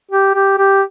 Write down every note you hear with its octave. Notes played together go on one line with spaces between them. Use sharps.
G4
G4
G4